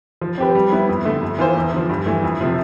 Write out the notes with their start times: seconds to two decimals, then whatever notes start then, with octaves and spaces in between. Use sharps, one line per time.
0.22 F3
0.38 C4 G4 B4
0.55 G3
0.72 B3 E4
0.89 F2
1.05 D3 A3
1.21 F2
1.39 E3 B3 F4 C5
1.55 E2
1.73 D3 F3
1.89 G2
2.06 E3 A3
2.24 F2
2.40 C3 F3 A3